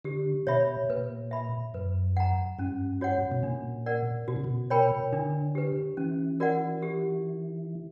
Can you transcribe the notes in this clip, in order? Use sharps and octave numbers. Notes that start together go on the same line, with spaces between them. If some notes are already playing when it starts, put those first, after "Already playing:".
D3 G4
B2 C#5 E5 B5
A#2 B4
E5 B5
F#2 B4
F#5 A#5
G2 C#4
F#4 C#5 F#5
B2
A#2 D4
A#4 D5 F#5
B2 F#4
C#3
B2
A#4 C#5 G5 B5
D3 D4
G4 B4
E3 C#4
F#4 A#4 D5 F#5
G4